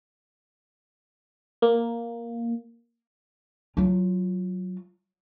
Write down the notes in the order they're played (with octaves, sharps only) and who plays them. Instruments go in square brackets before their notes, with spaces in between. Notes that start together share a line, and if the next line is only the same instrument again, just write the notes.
[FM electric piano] A#3
[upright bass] F#3 F4